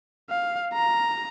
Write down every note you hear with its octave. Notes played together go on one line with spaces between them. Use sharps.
F5
A#5